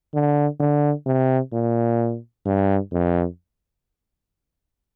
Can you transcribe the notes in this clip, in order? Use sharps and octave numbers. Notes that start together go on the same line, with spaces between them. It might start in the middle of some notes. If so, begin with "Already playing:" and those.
D3
D3
C3
A#2
G2
F2